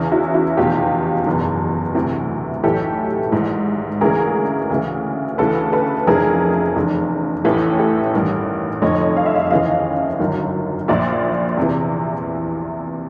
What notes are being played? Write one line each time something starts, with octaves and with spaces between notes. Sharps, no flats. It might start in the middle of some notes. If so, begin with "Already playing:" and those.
Already playing: E2 C#3 E3
E4 F#4
E4 F#4
F1 E2 B2 F4 G4
F#1 E2 B2
D2 C3 E3
B1 A2 E3 G4 A4
G#1 G#2 E3
D2 C#3 E3 G#4 A#4
D2 C#3 E3
D2 C#3 E3 A4 B4
A4 B4
F1 F2 C#3 E3 G#4 A#4
F1 E2 C#3
A1 A2 E3 G4 A4
G4 A4
A1 G2 D#3
F1 F2 D3 C#5 D#5
F5
E5
D#5 F5
D#2 C#3 E3 D#5 F5
G1 F#2 D#3
A#1 A#2 D5 E5
E2 C3 E3